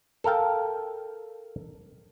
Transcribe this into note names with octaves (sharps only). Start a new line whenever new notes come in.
A4 A#4 F5 G5 A5